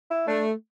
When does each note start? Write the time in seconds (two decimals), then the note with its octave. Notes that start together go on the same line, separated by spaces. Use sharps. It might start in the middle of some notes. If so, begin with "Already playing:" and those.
0.11 E4
0.27 A3 D4